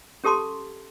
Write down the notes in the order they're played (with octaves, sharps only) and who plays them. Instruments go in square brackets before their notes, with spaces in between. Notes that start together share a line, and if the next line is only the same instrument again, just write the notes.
[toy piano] C#4 G4 A4 A5 C6 D6